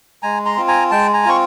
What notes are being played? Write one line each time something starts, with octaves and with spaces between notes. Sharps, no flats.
G#3 G#5 A#5
A#5 C6
C4 F4
G#5 A#5
G#3 G5 A5
G#5 A#5
C4 F4 C#6